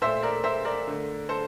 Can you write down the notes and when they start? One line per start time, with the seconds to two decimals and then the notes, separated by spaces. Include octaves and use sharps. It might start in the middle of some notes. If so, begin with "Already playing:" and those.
0.01 A#2 A3 C5 E5
0.22 A#4 D5
0.44 C5 E5
0.65 A#4 D5
0.87 D3 A3
1.29 A4 C5